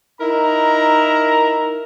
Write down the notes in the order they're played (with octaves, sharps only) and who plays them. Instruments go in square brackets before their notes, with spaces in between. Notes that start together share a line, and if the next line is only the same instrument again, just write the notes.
[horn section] D#4 E4 A#4 A#5